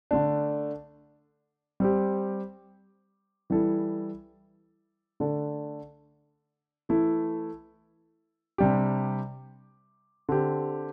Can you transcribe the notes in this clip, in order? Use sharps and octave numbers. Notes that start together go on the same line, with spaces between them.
D3 A3 D4
G3 C4 G4
E3 G3 E4 A4
D3 A3 D4 A4
E3 A3 E4 A4
C3 G3 D4 G4
D3 C4 G4